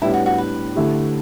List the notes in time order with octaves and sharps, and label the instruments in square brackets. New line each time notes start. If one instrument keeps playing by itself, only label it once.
[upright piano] A2 G3 B3 D4 [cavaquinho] E4
[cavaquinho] F#4
F#4
B4
[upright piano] D3 A3 E4 G4